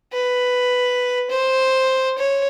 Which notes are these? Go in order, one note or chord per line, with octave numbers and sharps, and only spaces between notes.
B4
C5
C#5